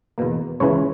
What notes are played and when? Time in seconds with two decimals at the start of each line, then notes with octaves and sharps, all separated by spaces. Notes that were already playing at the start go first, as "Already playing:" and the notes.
0.18 E2 B2 A#3
0.60 C#2 C#3 E3 C#5